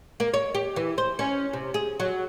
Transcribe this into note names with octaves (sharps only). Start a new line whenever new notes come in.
A#3
C#5
G4
E3
C5
C#4
C3
G#4
F#3